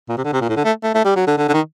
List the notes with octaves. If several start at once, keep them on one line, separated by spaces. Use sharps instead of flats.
A#2
C3
D3
C3
A#2
A2
D3
A3
A3
A3
G3
F#3
D3
D3
D3
D#3